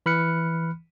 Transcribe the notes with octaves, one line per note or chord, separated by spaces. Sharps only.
E3 B5 F6 F#6 C#7